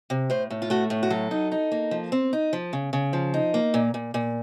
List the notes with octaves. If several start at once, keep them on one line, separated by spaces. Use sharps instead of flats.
C3
A2 C5
A2
F4
A3 F#4
A2
F#4
F#3 A4
D#4
D#4
A#3
F3
C4
D#4
F3
C#3
C#3
F3
D#4
A#3
A#2
A#2
A#2